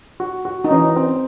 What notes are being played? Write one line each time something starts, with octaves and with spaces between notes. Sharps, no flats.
F#4
F#4
D#4
E3 C#4
C4